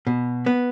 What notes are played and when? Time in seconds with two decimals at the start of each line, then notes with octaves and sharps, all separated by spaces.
0.07 B2
0.46 B3